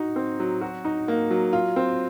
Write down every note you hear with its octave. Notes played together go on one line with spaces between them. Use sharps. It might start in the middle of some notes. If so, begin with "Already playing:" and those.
Already playing: D#4 F#4
C4
F#3
F#4
D#4
A#3
F#3
F4
C4